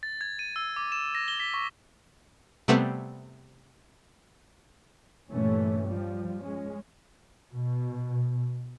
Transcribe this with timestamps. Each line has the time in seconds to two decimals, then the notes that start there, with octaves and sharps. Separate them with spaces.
0.03 A6
0.21 G#6
0.39 D#7
0.56 E6
0.76 D6
0.92 E7
1.15 A#6
1.28 G7
1.40 B6
1.54 C#6
2.68 C3 G3 A3 B3 C4
5.30 G2 A#2 E3 A3 C#4
5.86 F3 G3
6.40 G#3 C#4
7.53 B2